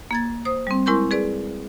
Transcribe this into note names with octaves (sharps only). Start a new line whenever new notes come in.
A#3 G#6 A6
C5 D#6
G3 C4
G#3 E4 A#4 C6 C#6 G6
G#4 B4 D5